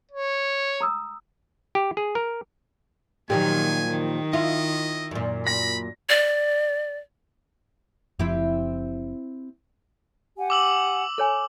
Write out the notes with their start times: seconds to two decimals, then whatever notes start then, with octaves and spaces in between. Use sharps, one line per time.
0.11 C#5
0.81 A#5 D#6 E6
1.75 G4
1.97 G#4
2.15 A#4
3.30 A#2 D#3 F3 F#3 A#3 G4 G#5
3.90 D#3
4.33 E4 F4 D#5
5.11 F#2 A#2
5.47 B5 A#6
6.09 D5
8.19 F#1 F3 C4 E4 G4
10.37 G4 F#5 G#5
10.50 D6 E6 F#7
11.18 A4 C#5 G#5